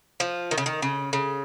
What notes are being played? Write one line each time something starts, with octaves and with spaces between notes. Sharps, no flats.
F3
D#3
C#3
D#3
C#3
C#3